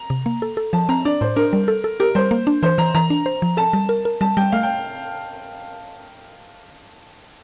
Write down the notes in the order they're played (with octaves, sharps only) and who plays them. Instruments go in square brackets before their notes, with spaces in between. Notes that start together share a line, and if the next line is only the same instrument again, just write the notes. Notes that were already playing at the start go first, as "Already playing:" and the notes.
Already playing: [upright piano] A#5
[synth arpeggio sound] C3
A#3
A4
A4
[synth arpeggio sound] F3 [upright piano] A5
[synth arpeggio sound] C4 [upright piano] A#5
[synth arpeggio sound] D4 [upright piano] D5
[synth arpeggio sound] A2 [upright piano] C5
[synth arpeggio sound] D4 [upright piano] A#4
[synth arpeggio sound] G3
A4
A4
[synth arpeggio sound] G4 [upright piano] A#4
[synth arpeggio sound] G3 [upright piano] C5
[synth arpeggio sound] A#3
D4
[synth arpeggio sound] E3 [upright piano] C5
[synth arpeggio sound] E3 [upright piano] A#5
[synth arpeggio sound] E3 [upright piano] A#5
[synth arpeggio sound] D4
C5
F3
[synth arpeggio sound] A4 [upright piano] A5
[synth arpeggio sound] G3
A#4
A#4
[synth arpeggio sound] G3 [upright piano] A5
[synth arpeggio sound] G3 [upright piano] G5
[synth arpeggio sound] A3 [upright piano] F5
[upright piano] G5